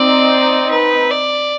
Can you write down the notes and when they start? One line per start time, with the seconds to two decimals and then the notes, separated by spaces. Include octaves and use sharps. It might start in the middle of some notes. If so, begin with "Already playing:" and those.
Already playing: C4 D#4 D5
0.71 B4
1.11 D5